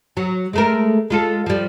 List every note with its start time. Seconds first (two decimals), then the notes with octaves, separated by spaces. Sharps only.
0.17 F#3
0.53 G#3 A3 A#4
1.10 G#3 F4 A4
1.46 F3 G3